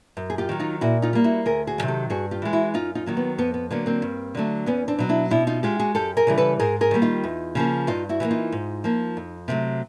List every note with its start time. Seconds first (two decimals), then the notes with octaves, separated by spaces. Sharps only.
0.17 F#2
0.30 G#4
0.38 F4 G4
0.49 D#3 F#3
0.60 D#4 F4
0.81 A#2 E4 F#4
1.02 D#4 F4
1.13 G3 A#3
1.24 E4 F#4
1.45 D2 G#4 A#4
1.67 F#4 G#4
1.78 C3 D#3 F#3
1.88 G4 A4
2.10 G2 F#4 G#4
2.31 F4 G4
2.42 E3 G#3
2.53 E4 F#4
2.74 F#2 D#4 F4
2.95 D#4 F4
3.06 D#3 F#3 A#3
3.17 B3
3.38 F2 B3
3.54 B3
3.71 D3 F#3 A#3 B3
3.86 A#3 C4
4.02 G2
4.35 D3 F#3 A3
4.66 E2 B3 C#4
4.88 C4 D4
4.99 B2 F#3
5.09 D4 E4
5.31 B2 D4 E4
5.47 D#4 F4
5.63 G#3 F4 G4
5.80 F#4 G#4
5.95 F#2 G4 A4
6.17 G#4 A#4
6.27 C#3 E3 G3
6.38 A4 B4
6.60 G#2 G#4 A#4
6.81 G#4 A#4
6.91 D#3 G3 A#3
7.02 D#4 F4
7.24 E2
7.55 C#3 F3 A#3
7.87 G2 D#4 F4
8.09 E4 F#4
8.20 E3 G3
8.25 A#3
8.31 D#4 F4
8.52 G#2
8.84 F3 A#3
9.17 F2
9.48 C3 D#3 F#3 A3